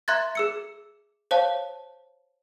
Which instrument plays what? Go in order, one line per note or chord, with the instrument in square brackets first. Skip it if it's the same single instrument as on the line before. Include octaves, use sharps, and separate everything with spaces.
[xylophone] E5 A#5 C6 F#6 G#6 A6
G#4 E6 C#7
C5 C#5 F5 A5